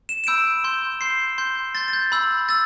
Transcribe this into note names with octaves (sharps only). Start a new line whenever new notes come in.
E7
E7
B5 E6 G6 D7
C6 G6
C6 G6 C7
C6 G6
C6 G6 A6
A6
G6
B5 E6 G6
E6 G6 A6